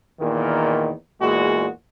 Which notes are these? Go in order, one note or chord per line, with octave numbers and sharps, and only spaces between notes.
E2 A#2 D#3
E2 A#2 G#3 F#4 G#4